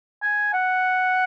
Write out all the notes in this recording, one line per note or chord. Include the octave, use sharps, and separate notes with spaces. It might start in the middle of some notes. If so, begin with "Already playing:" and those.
G#5
F#5